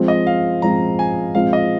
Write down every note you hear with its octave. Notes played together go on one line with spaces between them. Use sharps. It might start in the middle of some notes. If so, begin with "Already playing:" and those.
Already playing: F3 G#3 C4
D#5
F5
F3 G#3 C4 A#5
G#5
F3 G#3 C4 F5
D#5